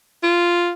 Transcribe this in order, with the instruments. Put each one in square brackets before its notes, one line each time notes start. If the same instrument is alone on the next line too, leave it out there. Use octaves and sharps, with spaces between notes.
[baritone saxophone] F4